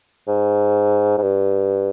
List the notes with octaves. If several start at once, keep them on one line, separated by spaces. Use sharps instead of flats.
G#2
G#2
G2